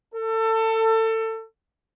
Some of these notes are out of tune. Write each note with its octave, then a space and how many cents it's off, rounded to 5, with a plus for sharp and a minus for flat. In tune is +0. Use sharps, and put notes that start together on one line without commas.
A4 +25